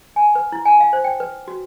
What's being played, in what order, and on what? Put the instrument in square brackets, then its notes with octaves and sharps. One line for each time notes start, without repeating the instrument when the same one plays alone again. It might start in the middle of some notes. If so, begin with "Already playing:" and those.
[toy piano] G#5
B4
E4
G#5
F5
C5
G5
B4
F#4